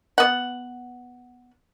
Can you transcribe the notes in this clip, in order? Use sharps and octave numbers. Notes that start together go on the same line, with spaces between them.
B3 F#5